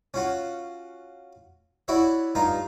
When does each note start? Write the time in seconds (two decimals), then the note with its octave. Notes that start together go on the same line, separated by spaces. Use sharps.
0.14 C#4 F4 F#4
1.88 E4 F#4 C#5 D5 E5
2.35 G2 D#4 F4 A#5